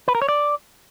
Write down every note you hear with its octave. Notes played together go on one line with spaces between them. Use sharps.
B4
A#4
C#5
D5